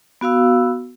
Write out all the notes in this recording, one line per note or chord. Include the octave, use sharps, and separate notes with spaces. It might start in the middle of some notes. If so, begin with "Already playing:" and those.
B3 F#4 F5 E6